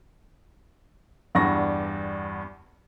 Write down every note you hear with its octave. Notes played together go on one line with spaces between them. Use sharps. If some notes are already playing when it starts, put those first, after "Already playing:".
E2 G2 D4 F#5 C#6 A#6